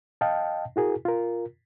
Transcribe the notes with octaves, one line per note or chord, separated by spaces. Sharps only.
D#5 F5 G5 A5
E4 F#4 G#4 A#4
F4 A#4